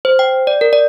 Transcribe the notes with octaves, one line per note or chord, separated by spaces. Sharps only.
C5
G5
D5
A#4
D5